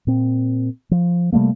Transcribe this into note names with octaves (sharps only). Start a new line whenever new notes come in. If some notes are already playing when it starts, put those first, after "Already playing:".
A#2 C4
F3
C3 G3 A3 A#3